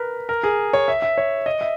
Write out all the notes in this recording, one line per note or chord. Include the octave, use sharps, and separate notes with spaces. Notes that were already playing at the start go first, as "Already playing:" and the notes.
Already playing: A#4 B4
A#4
G#4
C#5
E5
E5
C#5
D#5
E5